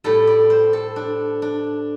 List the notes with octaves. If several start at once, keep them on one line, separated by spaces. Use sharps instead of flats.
A2 G3 A4
D5
C5
A4
D4
D4